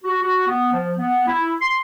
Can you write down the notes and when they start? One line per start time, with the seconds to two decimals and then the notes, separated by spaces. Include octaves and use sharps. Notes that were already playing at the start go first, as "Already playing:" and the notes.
0.04 F#4
0.22 F#4
0.47 B3
0.73 F3
0.98 B3
1.27 E4
1.61 C6